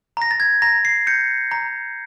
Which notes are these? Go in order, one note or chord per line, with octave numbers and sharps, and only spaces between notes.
A#5 A#6
A6
G#6
A#5 A#6
C7
G6 C#7
A#5